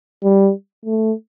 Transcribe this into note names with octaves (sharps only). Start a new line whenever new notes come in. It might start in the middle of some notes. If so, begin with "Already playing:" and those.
G3
A3